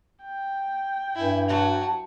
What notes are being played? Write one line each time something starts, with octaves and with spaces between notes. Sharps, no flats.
G5
G2 E4 G#5
F#3 F#4 A5